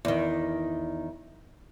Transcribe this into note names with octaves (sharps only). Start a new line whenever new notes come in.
E2 D#3